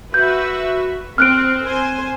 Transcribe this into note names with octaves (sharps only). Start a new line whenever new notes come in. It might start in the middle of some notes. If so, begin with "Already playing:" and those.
F#4 B4 E5 G6
C4 F6 F#6 D7
C5 G#5